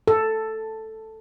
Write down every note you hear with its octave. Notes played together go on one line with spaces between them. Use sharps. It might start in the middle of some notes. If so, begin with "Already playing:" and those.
A4